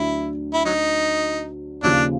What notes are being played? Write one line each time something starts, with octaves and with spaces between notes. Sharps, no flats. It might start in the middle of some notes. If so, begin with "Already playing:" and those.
Already playing: D2 D3 F#3 E4
E4
F#3 D#4
D#2 C#3 F3 F#3 D4